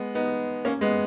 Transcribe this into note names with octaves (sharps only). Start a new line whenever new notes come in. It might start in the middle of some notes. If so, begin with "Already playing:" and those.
Already playing: G#3 B3
B3 D#4
A#3 C#4
G#3 B3